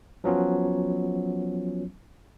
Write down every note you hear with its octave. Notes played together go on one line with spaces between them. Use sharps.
F3 F#3 B3 C#4 F4